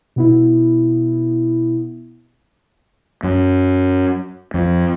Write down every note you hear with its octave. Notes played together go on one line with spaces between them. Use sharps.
B2 B3 E4
F#2
F2